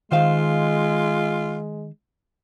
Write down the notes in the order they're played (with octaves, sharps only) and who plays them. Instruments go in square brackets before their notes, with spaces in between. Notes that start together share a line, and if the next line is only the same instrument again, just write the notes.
[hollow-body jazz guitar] D#3 C5 F5 [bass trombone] G#3 [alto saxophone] F4